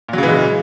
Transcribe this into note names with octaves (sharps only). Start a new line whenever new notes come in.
A#2 C#3 E3 F#3 G#3